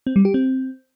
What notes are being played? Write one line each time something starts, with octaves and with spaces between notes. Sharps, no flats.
C4
G3
G4
C4